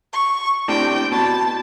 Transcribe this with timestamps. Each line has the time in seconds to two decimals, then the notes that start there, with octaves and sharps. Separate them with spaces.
0.13 C#6
0.68 A2 C3 D4 G5
1.12 B2 A5